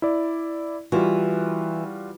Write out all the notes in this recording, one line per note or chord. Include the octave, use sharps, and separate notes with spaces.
E4 D5
E3 G3 F4 F#4